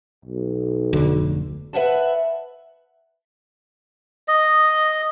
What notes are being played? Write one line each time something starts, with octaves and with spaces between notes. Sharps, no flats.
B1
F1 D2 D3
B4 E5 F#5 A5
D#5